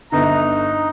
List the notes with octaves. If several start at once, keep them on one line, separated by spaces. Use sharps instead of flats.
G1 D3 D#4 A#5